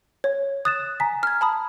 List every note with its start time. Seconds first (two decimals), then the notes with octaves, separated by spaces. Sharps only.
0.24 C#5
0.65 D#6 F#6 A6 E7
1.00 G#5 A#5 B6
1.23 F6 G#6
1.41 A5 B5 D#6